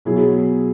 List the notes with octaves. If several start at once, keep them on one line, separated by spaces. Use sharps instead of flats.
B2 F#3 E4 G#4